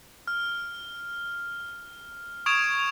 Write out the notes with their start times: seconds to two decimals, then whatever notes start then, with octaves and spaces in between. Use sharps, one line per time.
0.28 F6
2.46 C#6 D#6 G#6 D7 E7 F7